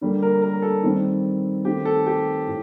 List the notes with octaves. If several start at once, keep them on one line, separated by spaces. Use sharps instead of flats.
D3 G3 A#3
A#4
A#4
A4
D#3 G3 C4
D#3 A3 C4 G4
A4
G4
A2